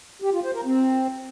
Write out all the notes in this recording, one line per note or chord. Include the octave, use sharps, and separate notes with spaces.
G4
F4
C5
A#4
C4